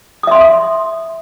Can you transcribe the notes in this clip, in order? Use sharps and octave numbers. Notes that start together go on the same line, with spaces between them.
E5 C6 D#6